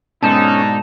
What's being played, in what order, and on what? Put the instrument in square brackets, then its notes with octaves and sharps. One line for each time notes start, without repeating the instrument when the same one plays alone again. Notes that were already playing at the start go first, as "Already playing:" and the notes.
[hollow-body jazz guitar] G#2 B2 [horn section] D3 D#4 [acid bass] C#4 [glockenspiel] A5 E7